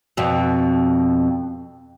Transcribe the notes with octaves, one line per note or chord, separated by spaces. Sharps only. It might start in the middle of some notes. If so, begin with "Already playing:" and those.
F2 B2